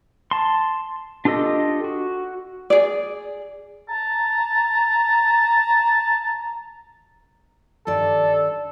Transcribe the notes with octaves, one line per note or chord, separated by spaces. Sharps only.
A5 C6
D4 F4 G4 A4 D#5
F#4
G#4 D5
A5 A#5
G2 D#3 A4 D5